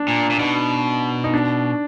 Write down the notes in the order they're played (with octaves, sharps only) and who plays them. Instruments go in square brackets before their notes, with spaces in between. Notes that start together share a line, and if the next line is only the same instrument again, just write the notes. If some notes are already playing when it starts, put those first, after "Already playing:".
Already playing: [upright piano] D4
[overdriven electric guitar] A#2
A#2
[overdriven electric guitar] B2 [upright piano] D#4
[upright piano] D#4
D4